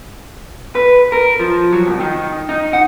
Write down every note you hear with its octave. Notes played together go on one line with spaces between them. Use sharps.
B4
A#4
F3
F#3
C2
D#3
D#4
F#5